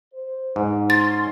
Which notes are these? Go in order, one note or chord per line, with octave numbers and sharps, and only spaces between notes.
C5
G#2 D#4
C#4 C6 A6